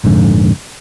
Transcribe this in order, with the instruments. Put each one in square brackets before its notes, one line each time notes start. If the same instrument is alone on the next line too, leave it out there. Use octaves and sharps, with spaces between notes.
[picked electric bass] A#1 F2 G#2 D3